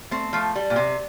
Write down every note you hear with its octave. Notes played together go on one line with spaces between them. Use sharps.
A3 C4
F3 A3
G3
A#2
C3